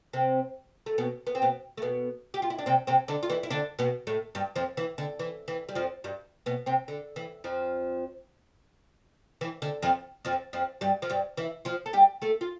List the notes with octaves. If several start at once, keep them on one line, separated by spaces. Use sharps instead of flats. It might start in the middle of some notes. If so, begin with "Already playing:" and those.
C3 C4
A3
B2 B3
B3
C4
B2 B3
A3
B2 B3
G4
F4
E4
D4
C3 C4
C3 C4
D3 D4
F4
E3 E4
E4
D3 D4
B2 B3
A2 A3
G2 G3
F2 F3
E3
D3
E3
E3
G3
F2 F3
G2 G3
B2 B3
C3 C4
D3
E3
F2 F3
E3
D3
F2 F3
F2 F3
F2 F3
G2 G3
F3
G2 G3
E3 E4
F3 F4
A4
G3 G4
A3 A4
F4